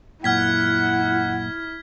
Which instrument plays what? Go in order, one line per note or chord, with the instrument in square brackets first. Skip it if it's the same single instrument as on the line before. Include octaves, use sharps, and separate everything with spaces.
[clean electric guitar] F#2 A#2 [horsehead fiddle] E4 [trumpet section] F#5 [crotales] F6 G#6 B6